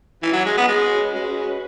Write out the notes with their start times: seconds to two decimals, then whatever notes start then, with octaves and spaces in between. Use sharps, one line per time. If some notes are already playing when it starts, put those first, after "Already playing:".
0.23 E3 C#4 F#4 B4
0.33 F#3
0.45 G#3
0.57 B3
0.68 G#3
1.15 G#3